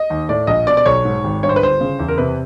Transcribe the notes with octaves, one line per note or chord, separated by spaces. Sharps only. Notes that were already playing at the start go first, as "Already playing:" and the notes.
Already playing: D#5
D#2
A2 D5
A#1 D#5
B2 D5
D5
B1 C#5
G#2
G#1
G2 C#5
C5
B4
G1 C5
C#3
E2
A#4
C3 B4